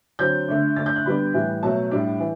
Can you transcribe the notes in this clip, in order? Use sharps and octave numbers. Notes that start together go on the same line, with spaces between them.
D3 F#3 C4 G6
D3 A3 D4
D3 A3 D4 A6
G6
F#6
D3 G3 B3 D4 B5
A2 E3 G3
B2 F#3 A3 A5
A2 G3 D4
E3